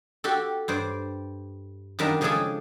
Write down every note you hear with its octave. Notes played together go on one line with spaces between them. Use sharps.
F#4 G4 A4
G2 C5 D5
F#2 D#3 G3 D4 F4 A#5
C#3 F3 G#3 D4 G#4 A4